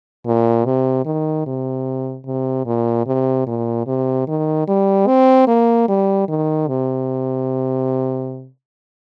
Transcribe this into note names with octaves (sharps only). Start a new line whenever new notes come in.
A#2
C3
D#3
C3
C3
A#2
C3
A#2
C3
D#3
G3
C4
A#3
G3
D#3
C3